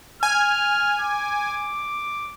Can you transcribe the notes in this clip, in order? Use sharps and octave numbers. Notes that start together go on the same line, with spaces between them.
G#5 F6
D6